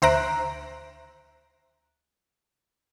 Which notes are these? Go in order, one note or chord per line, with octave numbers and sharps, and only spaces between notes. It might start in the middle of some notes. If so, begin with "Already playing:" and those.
D2 C5 E5 A#5 F#6 D7